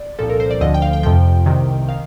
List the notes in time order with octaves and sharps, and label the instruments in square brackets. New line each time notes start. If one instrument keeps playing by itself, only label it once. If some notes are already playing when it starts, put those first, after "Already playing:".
Already playing: [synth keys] D5
C2 A#2 F3 A4
A#4
C5
D5
D2 D3 F3 D#5
G5
F5
G5
F2 C3 F3 G5
C2 C3 D#3
D#3 F5